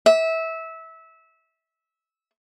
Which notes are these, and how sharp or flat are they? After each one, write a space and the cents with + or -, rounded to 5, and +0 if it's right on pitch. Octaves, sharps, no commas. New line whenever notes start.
E5 -20